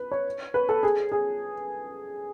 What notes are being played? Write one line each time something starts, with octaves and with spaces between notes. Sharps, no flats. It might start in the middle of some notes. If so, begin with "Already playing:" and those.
Already playing: B4
C#5
B4
A4
G#4
G#4